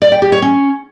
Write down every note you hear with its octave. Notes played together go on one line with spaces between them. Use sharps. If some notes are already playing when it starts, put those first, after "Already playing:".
D5
G5
G4
C#5
C#4